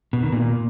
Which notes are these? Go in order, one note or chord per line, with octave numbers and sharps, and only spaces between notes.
B2
D#3
A#2